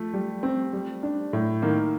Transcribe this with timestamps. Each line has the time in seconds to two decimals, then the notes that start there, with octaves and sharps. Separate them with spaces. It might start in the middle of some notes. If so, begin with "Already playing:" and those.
Already playing: F3 A3
0.14 G3
0.43 C4
0.73 G3
1.03 D4
1.33 A2
1.62 D#3 A#3